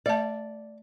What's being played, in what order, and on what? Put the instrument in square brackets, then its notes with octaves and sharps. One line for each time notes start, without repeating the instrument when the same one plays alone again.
[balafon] A3 F5 A5 [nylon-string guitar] D5